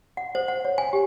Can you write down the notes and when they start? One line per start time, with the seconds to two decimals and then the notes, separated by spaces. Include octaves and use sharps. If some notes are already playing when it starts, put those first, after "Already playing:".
0.17 F#5
0.35 C5
0.48 F#5
0.65 C#5
0.78 G#5
0.93 G4